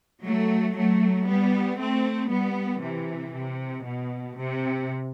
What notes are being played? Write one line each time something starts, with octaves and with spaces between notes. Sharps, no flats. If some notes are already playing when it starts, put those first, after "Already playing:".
F#3 A3
F#3 A3
G3 B3
A3 C4
G3 B3
C3 E3
C3
B2
C3